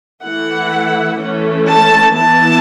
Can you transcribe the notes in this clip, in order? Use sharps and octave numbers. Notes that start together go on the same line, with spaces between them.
E3 A3 E4 F#5
E3 A3 C#4
A5
E3 B3 E4 A5